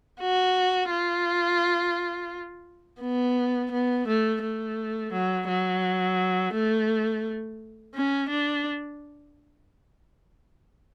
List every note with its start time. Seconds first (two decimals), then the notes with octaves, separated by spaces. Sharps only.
0.20 F#4
0.90 F4
3.01 B3
3.72 B3
4.08 A3
4.43 A3
5.13 F#3
5.48 F#3
6.54 A3
7.95 C#4
8.30 D4